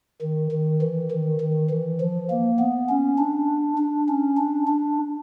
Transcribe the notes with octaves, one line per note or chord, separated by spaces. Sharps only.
D#3
D#3
E3
D#3
D#3
E3
F3
A#3
B3
C#4
D4
D4
C#4
D4
D4